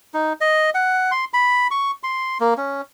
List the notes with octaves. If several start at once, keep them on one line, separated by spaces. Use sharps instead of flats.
D#4
D#5
F#5
C6
B5
C#6
C6
A#3
C#4